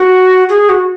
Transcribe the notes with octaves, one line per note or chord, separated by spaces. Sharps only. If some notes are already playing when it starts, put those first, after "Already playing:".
Already playing: F#4
G#4
F#4